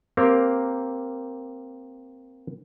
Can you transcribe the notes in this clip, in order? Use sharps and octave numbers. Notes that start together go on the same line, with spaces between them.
A#3 C4 G4 A#4